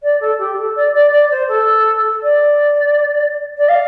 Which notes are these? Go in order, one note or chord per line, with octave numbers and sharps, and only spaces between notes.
D5
A4
G4
A4
D5
D5
D5
C5
A4
D5
D5
F5